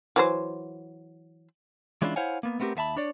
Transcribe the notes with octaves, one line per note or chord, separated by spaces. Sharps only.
E3 F#3 C5
E3 G#3 C#4 D4 E4 F4
E4 C5 C#5 F5 F#5 G#5
A#3 B3
A3 B3 C4 F4 G4 A#4
D#2 B3 E5 A5 B5
D4 C#5 D5